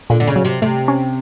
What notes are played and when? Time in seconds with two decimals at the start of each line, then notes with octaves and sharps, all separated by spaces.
0.10 A#2 D3
0.20 D3
0.27 C#3
0.36 F#3
0.45 C3
0.62 C3 A3
0.88 C#4